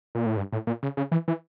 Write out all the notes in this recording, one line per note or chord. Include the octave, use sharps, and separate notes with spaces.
A#2
A2
G2
A2
A#2
C#3
C#3
E3
E3